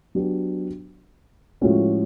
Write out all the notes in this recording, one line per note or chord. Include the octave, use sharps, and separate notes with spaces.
F#3 B3 D4 G4
A2 F3 G#3 C#4 F#4